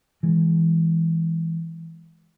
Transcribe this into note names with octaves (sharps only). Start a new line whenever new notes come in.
E3 G#3